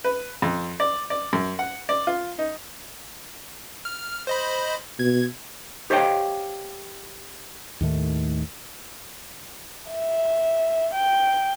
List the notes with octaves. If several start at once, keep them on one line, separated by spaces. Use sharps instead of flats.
B4
F2
D5
D5
F#2
F#5
D5
F4
D#4
F6
C5 D#5 B5
B2 G#6
G4 C5 C#5 D#5 F5 G5
D#2 A2 D#3 A3
E5
G5